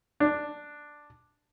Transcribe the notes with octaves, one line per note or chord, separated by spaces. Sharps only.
D4